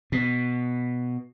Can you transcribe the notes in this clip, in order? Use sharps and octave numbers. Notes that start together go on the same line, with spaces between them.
B2